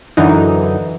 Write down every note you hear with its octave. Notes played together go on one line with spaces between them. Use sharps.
F#2 D3 E3 D#4